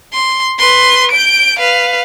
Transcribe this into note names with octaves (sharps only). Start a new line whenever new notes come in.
C6
B4 C6
G6 D7
B4 F5